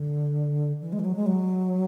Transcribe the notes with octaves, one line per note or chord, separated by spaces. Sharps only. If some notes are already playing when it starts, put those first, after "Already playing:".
Already playing: D3
E3
G#3
E3
F#3
G#3
F#3